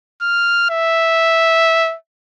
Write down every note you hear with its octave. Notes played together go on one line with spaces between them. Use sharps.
F6
E5